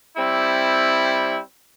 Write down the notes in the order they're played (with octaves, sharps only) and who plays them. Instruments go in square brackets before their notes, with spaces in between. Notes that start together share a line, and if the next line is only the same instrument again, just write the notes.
[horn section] G3 C4 E4